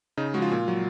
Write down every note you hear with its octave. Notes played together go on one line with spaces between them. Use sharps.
C#3 D#4
F3 G#3 F4 F#4
A#2
F#3